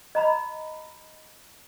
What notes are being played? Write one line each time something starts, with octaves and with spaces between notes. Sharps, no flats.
D#5 A#5 B5